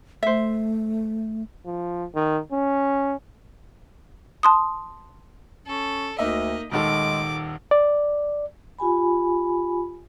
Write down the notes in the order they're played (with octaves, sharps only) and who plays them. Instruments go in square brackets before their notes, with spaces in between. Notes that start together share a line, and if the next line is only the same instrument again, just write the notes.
[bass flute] A3 [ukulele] C5 E5
[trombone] F3
D#3
C#4
[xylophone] A5 C6 D#6
[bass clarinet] C#4 [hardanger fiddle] A4
[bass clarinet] D2 [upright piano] A#3 D#4 E5 [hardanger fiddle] D#5
[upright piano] D#1 D#3 A4 [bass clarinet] G#3 [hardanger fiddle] D6
[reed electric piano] D5
[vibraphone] F4 G4 G#5 B5